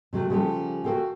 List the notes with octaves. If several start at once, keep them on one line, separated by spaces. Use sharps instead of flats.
C3 F#3 A3
C#3 F3 G3 F#4 G4 A4
F#4 G#4 A4 F5 G5